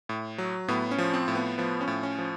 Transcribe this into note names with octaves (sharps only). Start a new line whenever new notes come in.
A2
F#3
A2 B3
C#4
F3
C4
A2
B3
F3 B3
C#4
A2
C#4
F3